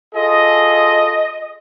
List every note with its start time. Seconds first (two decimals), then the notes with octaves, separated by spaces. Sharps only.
0.15 F4 G#4 A4 D#5